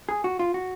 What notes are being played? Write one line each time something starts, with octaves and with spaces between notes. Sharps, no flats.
G#4
F#4
F4
F#4